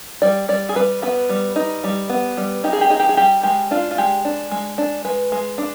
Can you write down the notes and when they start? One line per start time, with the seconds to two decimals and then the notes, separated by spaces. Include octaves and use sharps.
0.22 G3 D5
0.49 G3 D5
0.69 G#4
0.75 G3 B4
1.02 B3 B4
1.29 G3
1.56 D#4
1.84 G3
2.09 B3
2.37 G3
2.64 D#4 G4
2.73 G#4
2.81 G4
2.90 D#4 G#4
3.00 G4
3.09 G#4
3.17 G3 G4
3.43 G#3 G4
3.71 D4 F4
3.91 F4
3.98 G#3 G4
4.25 D4
4.51 G#3
4.78 D4
5.04 G#3 B4
5.32 G#3
5.58 D4